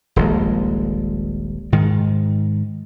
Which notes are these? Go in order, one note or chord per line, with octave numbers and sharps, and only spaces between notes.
D#1 A#1 G#3
G#2 D#3